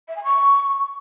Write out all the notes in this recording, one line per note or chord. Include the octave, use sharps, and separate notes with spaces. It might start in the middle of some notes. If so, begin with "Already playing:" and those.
E5
G#5
C#6